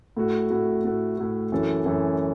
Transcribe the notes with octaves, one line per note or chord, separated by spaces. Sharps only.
A2 A3 F#4
A2 A3 F#4
A2 A3 F#4
A2 A3 F#4
F#2 E3 C#4 A4
F#2 E3 C#4 A4